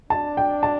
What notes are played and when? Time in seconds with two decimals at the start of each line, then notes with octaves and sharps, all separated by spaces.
0.10 D4 A5
0.37 G5
0.63 A5